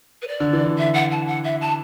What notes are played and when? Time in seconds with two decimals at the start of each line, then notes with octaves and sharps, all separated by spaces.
0.22 B4
0.27 D5
0.40 D3
0.53 E3
0.64 D3
0.78 E5
0.94 F#5
1.11 A5
1.27 F#5
1.44 E5
1.61 A5